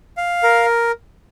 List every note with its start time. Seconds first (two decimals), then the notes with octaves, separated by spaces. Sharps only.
0.17 F5
0.43 A#4